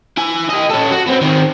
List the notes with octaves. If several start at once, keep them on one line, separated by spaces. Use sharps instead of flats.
E4 G#5
G4 D#5
C#4 A4
F#4
B3 C4
D#3 C4